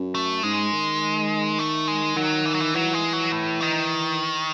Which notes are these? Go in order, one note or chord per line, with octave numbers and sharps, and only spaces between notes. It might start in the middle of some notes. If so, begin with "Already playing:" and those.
Already playing: F#2
A3
G#2 G#3
D#3
A3
G#3
D#3 F#3
E3
F#3
E3
E3 F#3
G#3
F#3
A2
D#3